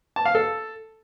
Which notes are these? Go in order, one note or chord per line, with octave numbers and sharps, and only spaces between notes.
A5
F5
A4